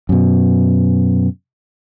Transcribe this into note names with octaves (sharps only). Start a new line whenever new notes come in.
F#2 B2